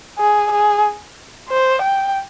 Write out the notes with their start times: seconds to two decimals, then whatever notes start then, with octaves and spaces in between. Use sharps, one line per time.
0.19 G#4
0.52 G#4
1.49 C5
1.82 G5